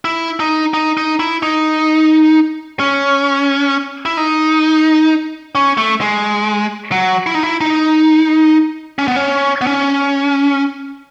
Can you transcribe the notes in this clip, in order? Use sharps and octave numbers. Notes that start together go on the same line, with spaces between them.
E4
D#4
D#4
D#4
E4
D#4
C#4
E4
D#4
C#4
A3
G#3
F#3
E4
D#4
E4
D#4
C#4
B3
C#4
B3
C#4